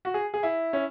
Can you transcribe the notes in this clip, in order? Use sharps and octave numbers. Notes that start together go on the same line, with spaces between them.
F#4
G#4
G#4
E4
C#4